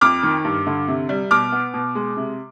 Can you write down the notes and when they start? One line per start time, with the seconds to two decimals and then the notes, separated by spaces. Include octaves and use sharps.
0.01 F2 D6 F6
0.23 D#3
0.45 G2
0.67 D3
0.88 C3
1.09 G3
1.31 B2 D6 F6
1.52 B3
1.74 B2
1.95 G#3
2.17 C3